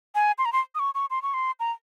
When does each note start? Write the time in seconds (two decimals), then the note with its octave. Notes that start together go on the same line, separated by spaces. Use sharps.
0.15 G#5
0.38 C6
0.45 A#5
0.53 C6
0.75 D#6
0.79 C#6
0.95 C#6
1.10 C6
1.22 C#6
1.34 C6
1.60 A#5